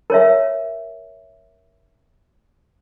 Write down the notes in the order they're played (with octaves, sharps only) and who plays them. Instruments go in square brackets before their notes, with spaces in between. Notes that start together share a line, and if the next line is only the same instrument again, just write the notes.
[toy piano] A#4 C#5 E5